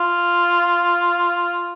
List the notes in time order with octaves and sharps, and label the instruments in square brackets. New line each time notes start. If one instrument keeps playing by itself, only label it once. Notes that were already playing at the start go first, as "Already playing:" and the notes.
Already playing: [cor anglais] F4